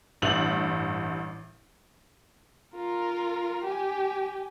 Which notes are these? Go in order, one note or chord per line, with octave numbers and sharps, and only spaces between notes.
A1 G2 E5 F#7
F4 A#4
G4 G#5